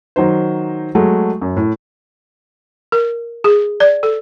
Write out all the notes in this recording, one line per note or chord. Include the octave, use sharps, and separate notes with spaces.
D#3 F#3 D#4 C5
F#3 G#3 A3
F#2
A2
A#4
G#4
D5
A4